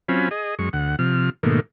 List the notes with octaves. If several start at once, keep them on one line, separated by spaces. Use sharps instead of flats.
F#3 C4 C#4 F4 G#5 B5
G#4 D#5
F#2 G#3 C#6
D2 F#5
C3 F3 F6
G#2 B2 D#3 A3 A#3